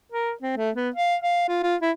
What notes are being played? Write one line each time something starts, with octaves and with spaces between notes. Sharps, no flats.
A#4
C4
A3
B3
F5
F5
F4
F4
E4